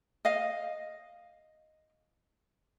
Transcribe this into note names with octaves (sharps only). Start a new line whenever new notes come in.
D#5 F5